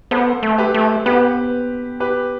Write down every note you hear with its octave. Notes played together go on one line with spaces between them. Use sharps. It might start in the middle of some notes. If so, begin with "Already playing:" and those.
B3 A4 C5
A3
G4 B4
A3
B3 G4 B4
G4 B4